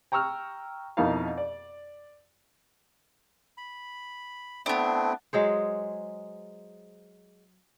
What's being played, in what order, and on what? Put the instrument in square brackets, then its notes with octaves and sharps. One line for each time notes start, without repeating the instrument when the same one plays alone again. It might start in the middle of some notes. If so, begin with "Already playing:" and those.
[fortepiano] G5 A#5 C#6 E6 F6
F2 B2 D#4 E4 A#4 F5
D5
[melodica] B5
[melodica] A3 C4 E4 [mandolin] B3 D4
[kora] F#3 G#3 G#4 C5